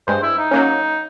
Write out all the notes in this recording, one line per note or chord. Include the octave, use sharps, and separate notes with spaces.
G2 G#3 C5
E4
D#4
F#3 A#3 C#4